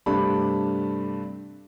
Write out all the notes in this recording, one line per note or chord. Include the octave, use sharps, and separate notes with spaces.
G2 C3 A3 D4 B5